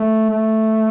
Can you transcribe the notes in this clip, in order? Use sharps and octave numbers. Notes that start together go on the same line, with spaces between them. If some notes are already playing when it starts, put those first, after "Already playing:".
Already playing: A3
A3